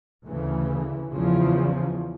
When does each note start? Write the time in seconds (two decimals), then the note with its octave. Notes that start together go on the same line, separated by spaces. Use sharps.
0.25 D2 C#3 E3
1.14 E2 C#3 F3